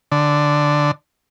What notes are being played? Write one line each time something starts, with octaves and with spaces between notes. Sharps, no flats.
D3